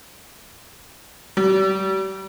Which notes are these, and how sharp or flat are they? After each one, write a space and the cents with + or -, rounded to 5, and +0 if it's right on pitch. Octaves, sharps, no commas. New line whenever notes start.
G3 -40